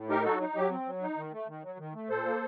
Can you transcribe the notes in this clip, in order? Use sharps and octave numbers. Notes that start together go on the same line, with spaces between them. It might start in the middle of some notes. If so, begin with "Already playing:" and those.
Already playing: A2
D#4 G4 A#4
F#3 F#4 A4
D#4
F#3 G4
C4
F#3
D#4
D#3
A3
D#3
F#3
D#3
A3
A#2 A4 C5
A#3